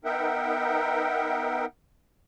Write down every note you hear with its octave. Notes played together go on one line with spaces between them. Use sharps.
B3 D#4 A#4 E5 F#5 G5